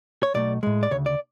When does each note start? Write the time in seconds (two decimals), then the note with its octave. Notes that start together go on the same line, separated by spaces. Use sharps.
0.23 C#5
0.34 B1 B2 A3 D5
0.63 A2 G#3
0.83 D5
0.91 D2 C#3 C#5
1.06 D5